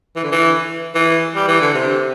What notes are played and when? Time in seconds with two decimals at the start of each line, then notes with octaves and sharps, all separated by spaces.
0.16 E3
0.24 D3
0.32 E3
0.95 E3
1.35 G3
1.48 E3
1.61 D3
1.74 C3